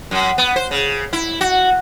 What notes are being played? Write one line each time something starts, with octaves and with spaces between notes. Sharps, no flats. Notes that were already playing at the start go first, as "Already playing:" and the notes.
F#2
B3
C5
C#3
E4
F#4